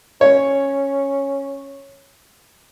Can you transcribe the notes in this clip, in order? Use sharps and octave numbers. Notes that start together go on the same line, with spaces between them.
C#4 C#5